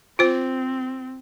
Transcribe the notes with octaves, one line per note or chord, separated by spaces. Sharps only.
C4 F4 C5